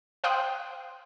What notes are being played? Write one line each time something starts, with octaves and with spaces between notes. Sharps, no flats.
C5 F5 G5 C6 D#6 F#6